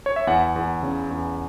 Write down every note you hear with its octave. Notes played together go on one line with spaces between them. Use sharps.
C#5
E5
E2 F#5
E2
C#3
E2